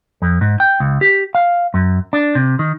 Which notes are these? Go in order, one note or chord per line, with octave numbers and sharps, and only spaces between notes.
F2
G#2
G5
C#2
G4
F5
F#2
D4
C3
D#3